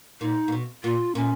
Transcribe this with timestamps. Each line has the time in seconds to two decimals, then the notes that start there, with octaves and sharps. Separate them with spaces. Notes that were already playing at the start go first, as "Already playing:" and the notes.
0.21 A#2 D#4
0.48 A#2
0.52 B2
0.84 A#2 F4
1.15 A#2 C#4